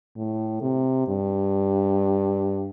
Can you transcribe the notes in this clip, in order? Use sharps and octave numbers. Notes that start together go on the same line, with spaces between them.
A2
C3
G2